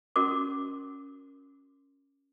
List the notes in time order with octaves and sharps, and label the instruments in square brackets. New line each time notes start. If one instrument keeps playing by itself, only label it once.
[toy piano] C#4 F#4 A#4 D6